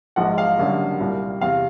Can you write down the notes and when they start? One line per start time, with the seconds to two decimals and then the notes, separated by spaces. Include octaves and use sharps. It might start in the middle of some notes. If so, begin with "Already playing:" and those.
0.16 A#1 G#2 F3 G#3 F#5
0.38 F5
0.58 F#1 F#2 D3 G3
1.00 C2 A#2 G3
1.41 E2 C3 F5